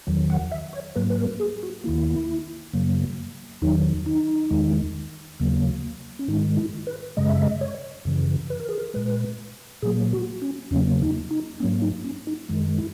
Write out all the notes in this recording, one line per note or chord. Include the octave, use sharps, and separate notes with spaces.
E2 D#3 F#3
F#5
E5
C#5
G#2 F#3 A#3 B4
B4
A#4
G#4
F#4
D#2 D#3 A#3 E4
F#2 C#3 F#3 A#3
E2 D#3 F#3 D#4
D#4
E2 D#3 G#3
D#2 C#3 F#3 A#3
C#4
G#2 D#3 G#3 D#4
E4
B4
F#2 C#3 G#3 D#5
E5
D#5
C#5
F#2 C#3 E3
B4
A#4
G#4
A#4
A#2 G#3 B4
A#2 F#3 A#3 G#4
F#4
C#4
E2 C#3 F#3 A#3 C#4
D#4
D#4
G#2 F#3 A#3 C#4
D#4
C#4
D#4
F#2 D#3 G#3
E4